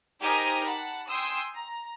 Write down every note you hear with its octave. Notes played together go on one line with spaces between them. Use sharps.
D#4 G4 A#4 C5 D#5 G#5
F#5 A5 B5
G5 G#5 C6 D#6 E6
A#5